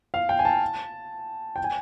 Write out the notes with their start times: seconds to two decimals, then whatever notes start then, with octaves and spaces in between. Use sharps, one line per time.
0.14 F5
0.29 G5
0.39 G#5
0.45 A5
1.56 G5
1.64 G#5